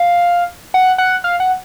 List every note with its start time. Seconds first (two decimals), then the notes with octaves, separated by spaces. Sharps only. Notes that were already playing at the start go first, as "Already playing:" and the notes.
Already playing: F5
0.74 F#5
0.98 F#5
1.24 F5
1.40 F#5